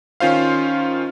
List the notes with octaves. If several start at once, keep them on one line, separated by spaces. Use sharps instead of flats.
D#3 C#4 F4 C5 F5